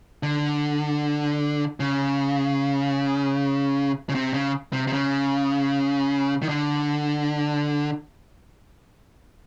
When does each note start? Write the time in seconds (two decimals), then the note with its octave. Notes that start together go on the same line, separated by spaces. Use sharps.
0.23 D3
1.80 C#3
4.09 C#3
4.15 C3
4.34 C#3
4.73 C3
4.87 C3
4.93 C#3
6.43 D#3
6.49 D3